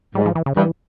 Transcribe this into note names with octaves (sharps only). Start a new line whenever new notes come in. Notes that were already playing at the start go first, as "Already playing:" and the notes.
G#2 G3
F3
E3
C#3
G2 E3